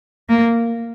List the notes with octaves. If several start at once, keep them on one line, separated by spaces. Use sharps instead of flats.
A#3